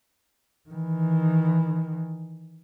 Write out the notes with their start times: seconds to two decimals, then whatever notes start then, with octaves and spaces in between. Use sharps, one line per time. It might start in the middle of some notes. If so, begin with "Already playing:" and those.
0.70 D#3 E3